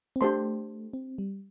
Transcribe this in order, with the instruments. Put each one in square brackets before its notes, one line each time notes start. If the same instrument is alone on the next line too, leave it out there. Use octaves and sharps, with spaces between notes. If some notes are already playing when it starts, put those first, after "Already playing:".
[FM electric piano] C4
[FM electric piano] A3 [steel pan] D4 G4 C5 A5 C6
[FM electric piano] C4
G3